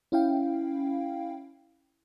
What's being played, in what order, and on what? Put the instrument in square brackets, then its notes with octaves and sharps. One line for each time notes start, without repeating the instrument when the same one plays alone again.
[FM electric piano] C#4 E4 F5 G5